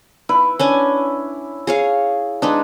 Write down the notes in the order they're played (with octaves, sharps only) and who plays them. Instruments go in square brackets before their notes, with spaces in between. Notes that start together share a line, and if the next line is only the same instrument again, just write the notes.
[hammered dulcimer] E4 [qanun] B4
[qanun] C#4 D4 G#5
G#4 C#5 F5
[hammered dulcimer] G#3 [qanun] D4 D#4 B4